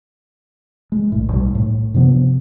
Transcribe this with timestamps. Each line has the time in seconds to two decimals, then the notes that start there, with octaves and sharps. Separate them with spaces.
0.92 G#3
1.12 A#1 A2
1.29 B1 G3
1.55 A2
1.94 G2 C3 F3 B3